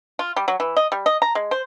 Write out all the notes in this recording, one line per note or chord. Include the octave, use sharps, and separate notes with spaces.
F4
G3
F#3
E3
D#5
G3
D#5
A#5
G#3
C5